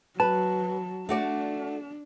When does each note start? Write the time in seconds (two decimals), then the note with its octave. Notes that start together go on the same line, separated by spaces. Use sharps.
0.20 F#3 B4 A5
1.09 A3 D4 F#4 D5